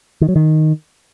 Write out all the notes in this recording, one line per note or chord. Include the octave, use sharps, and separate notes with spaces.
D#3
F#3
D#3